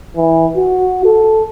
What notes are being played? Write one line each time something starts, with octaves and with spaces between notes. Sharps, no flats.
E3
F#4
A4